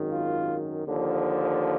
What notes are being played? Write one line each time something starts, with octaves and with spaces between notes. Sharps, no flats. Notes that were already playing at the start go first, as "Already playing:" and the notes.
Already playing: G#1 F#2 D#3
F4
D#2 D3 F3